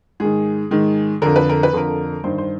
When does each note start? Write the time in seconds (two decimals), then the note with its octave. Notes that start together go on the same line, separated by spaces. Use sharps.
0.20 G#2 D#3 G#4
0.71 G#2 D#3
1.22 F2 D3 A#4
1.36 B4
1.49 A#4
1.63 B4
1.73 F2 D3 A#4
2.24 G2 D#3 C5
2.38 C5